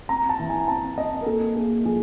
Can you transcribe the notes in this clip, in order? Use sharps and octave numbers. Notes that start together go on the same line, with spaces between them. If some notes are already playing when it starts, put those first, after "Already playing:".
C4 A#5
A5
E3
G#5
C4 A5
C4 D#5
A#4
A#3 A4
A#3 G#4
F3 G#4